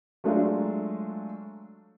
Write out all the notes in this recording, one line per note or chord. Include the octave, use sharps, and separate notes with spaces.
F#3 G#3 A3 D4 F4